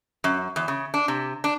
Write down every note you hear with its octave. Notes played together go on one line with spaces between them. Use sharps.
F#2
E2
C#3
D4
C3
D4